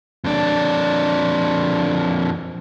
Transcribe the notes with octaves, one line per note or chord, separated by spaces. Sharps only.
F2 D4